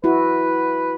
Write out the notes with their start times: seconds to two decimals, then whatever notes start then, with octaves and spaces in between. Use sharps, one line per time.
0.04 E4 F#4 B4